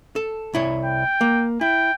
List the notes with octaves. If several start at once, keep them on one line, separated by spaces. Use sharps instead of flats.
A4
C2 E4 C#5
G5
A#3
E4 G5